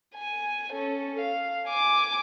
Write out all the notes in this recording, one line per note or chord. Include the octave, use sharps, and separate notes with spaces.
G#5
C#4 A4
F5
G#5 D6